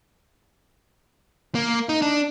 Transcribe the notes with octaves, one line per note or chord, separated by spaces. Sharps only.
A#3
D#4
D4